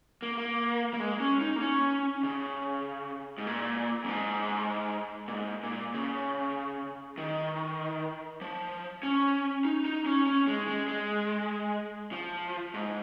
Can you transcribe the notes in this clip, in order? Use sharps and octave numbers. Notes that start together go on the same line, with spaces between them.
A#3
A#3
A#3
G#3
C#4
D#4
A#3
C#4
C#3
G#2
A#2
F2
G#2
A#2
G#2
A#2
C#3
D#3
F3
C#4
D#4
D#4
C#4
C#4
G#3
G#3
G#3
F3
G#2